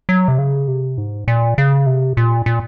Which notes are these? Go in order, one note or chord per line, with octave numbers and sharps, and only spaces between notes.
F#3
C3
C#3
C3
G#2
A#2
C#3
C3
A#2
A#2